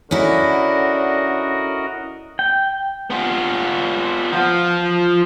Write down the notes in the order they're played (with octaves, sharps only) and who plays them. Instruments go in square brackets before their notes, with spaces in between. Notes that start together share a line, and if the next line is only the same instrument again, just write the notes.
[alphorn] D3 [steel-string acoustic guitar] C#4 E4 [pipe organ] F#4 A#4 D#5
[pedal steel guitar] G5
[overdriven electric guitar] B3 F4
F3 F4